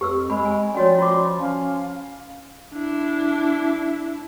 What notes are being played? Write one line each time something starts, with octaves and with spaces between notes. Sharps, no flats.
F2 G4 B4 E6
G#3 B5
G#5
F3 C#4 F#4 C#5 D5
F4 C6 D6
C#4 F5
D4 E4